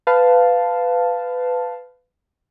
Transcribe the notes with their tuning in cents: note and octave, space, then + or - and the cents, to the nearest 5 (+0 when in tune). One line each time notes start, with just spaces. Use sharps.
B4 +20 F5 +0 A5 +0